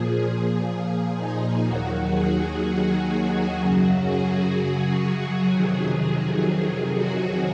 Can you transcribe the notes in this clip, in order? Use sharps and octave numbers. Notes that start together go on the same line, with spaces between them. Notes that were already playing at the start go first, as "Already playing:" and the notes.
Already playing: A#2 F3 G#4
G#4
D#4
D#2 D#3 F#3 F#4
G#4
G#4
F#2 C#3 F#3 F#4
G#4
F#4
F2 C3 D#3 F#3 G#4
F#4